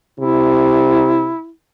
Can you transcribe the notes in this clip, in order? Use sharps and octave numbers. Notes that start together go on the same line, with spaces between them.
C3 E4